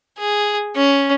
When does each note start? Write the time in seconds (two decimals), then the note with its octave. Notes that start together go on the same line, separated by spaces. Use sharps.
0.19 G#4
0.76 C#4